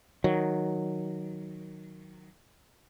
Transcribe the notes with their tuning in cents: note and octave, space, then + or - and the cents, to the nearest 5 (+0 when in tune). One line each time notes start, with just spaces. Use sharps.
D#3 +0 F#3 +0